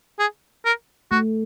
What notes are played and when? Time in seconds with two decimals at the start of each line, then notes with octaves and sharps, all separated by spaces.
0.19 G#4
0.65 A#4
1.11 A3 F#4